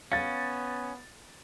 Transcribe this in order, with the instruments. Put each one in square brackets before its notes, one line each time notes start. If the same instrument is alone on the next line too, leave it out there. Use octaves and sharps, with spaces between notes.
[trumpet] B3 [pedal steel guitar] C#4 [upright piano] F5 A6